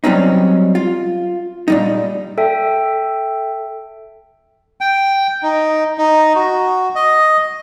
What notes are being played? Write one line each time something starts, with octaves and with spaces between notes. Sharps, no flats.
F#3 G3 C4 C#4 D#4
F4
A#2 G3 D#4
A4 E5 G5
G5
D#4
D#4
F#4
D#5